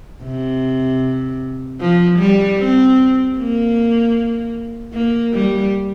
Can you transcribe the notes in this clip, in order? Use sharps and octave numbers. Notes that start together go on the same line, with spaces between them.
C3
F3
G3
C4
A#3
A#3
G3